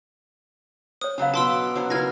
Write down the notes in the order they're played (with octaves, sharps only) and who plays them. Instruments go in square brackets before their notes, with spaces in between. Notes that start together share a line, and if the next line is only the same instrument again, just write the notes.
[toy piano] C5 C#5 [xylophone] D#6
[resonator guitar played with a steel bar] C#3 F#3 B3 [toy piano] D4 F5
[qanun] B2 D6 [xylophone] A5 C6 E6
[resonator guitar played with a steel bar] B2 D4 C5 [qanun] F#3
[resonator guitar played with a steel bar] C#3 A#3 [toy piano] D#4 E4 B4 [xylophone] F6 G#6 A#6